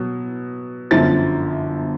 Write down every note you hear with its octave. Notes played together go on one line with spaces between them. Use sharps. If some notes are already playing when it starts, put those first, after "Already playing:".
Already playing: B2 F#3
G1 F#2 D3 F3 A6